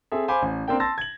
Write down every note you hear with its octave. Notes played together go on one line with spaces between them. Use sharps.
C4 G#4 A4 E5
C5 F5 G#5 B5 D6
A1
A#3 C4 D4 A#4 G5
A5 C6 E6 A6 A#6
G#6 F#7